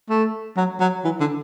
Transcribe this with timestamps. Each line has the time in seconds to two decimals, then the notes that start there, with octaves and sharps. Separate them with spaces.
0.10 A3
0.57 F#3
0.80 F#3
1.05 E3
1.20 D3